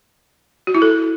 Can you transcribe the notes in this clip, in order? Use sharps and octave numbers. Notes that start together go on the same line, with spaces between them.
F#4
E4
A4